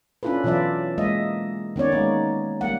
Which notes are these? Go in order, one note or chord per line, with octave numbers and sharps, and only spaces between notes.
C#4 D4 E4 F4 A4 B4
B2 E3 F#3 F4 D5 E5
G#3 A#3 D#5 E5
D#3 B3 C#4 C#5 D5
G#3 A#3 D#4
G3 A#3 F#5